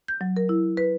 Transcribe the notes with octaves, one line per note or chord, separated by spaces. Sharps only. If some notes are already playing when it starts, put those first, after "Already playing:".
G6
F#3
A#4
E4
B4